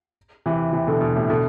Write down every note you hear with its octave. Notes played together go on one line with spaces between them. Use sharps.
C3 E3
C3 E3
B2 D3
B2 D3
A2 C3
B2 D3